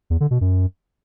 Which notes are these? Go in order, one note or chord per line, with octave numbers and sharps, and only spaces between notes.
E2
D3
B2
F#2